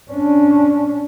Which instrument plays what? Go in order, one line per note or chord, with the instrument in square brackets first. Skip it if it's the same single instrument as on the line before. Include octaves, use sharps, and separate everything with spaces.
[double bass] C#4 D4